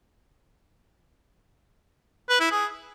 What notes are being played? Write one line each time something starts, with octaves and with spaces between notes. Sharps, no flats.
B4
E4
G#4